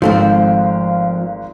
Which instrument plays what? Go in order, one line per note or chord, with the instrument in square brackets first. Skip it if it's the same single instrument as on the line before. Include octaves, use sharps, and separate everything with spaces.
[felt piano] G#1 G#2 [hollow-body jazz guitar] F3 A3 C4 [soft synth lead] F5